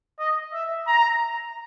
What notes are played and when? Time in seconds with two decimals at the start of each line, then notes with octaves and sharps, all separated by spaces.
0.19 D#5
0.53 E5
0.86 A#5